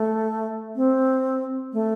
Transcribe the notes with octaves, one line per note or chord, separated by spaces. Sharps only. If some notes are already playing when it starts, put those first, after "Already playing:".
Already playing: A3
C4
A3